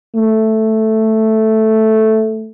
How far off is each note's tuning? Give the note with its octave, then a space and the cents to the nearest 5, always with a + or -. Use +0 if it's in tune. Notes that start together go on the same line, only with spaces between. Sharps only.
A3 +0